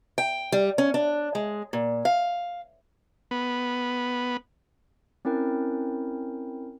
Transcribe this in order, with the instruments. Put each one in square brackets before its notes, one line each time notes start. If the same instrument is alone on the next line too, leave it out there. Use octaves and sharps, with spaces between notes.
[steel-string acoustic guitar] G5
G3
C#4
D4
G#3
A#2
F5
[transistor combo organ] B3
[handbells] C4 C#4 E4 A#4 G5